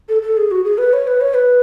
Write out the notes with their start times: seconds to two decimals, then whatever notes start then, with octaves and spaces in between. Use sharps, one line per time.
0.09 A4
0.22 A4
0.37 G#4
0.51 F#4
0.64 G#4
0.78 B4
0.93 C#5
1.07 B4
1.21 C#5
1.34 B4